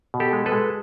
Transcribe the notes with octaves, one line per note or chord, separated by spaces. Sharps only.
B2
G4 A4
G#3
A4 B4
G#3